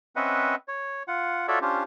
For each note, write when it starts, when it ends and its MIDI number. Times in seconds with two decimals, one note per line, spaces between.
0.16 0.55 60
0.16 0.55 61
0.16 0.55 71
0.16 0.55 75
0.16 0.55 76
0.16 0.55 78
0.68 1.03 73
1.08 1.47 65
1.08 1.47 78
1.48 1.59 65
1.48 1.59 66
1.48 1.59 69
1.48 1.59 73
1.48 1.59 74
1.48 1.59 76
1.62 1.83 61
1.62 1.83 62
1.62 1.83 65
1.62 1.83 67
1.62 1.83 72